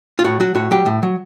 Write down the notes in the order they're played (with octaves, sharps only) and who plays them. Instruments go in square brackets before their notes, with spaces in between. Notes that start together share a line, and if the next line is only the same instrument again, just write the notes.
[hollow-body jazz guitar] F4
A2 F#4
F#3 F#4
A2 F#4
F#3 G4
A2
F#3